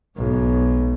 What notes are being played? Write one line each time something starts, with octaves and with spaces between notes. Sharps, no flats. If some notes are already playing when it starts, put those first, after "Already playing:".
B1 G#2